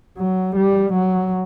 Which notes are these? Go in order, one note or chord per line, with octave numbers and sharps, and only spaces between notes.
F#3
G3
F#3